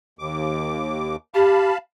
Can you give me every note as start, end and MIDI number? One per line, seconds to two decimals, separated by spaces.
0.19 1.16 39
0.19 1.16 86
1.34 1.71 67
1.34 1.78 77
1.34 1.78 81
1.34 1.78 83